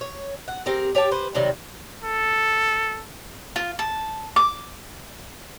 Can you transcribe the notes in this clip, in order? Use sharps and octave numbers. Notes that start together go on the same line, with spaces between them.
C#5
F#5
C4 G4 G#4 A#4
G4 C#5 G5 A5
B4 C5
C3 D#3 F#3 G3
A4
F4
A5
D6